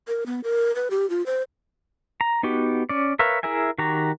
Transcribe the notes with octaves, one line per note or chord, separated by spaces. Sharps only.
A#4
B3
A#4
B4
G4
F4
C5
A#5
B3 D#4 F#4 G4
C#4 D5
A#4 B4 C#5 E5 F5
E4 G#4 A#4 E5 G#5
D#3 F#4 G4 A#5